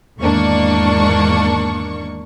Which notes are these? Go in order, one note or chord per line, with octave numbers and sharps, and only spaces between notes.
E2 G#2 D#3 A#3 D4 C#6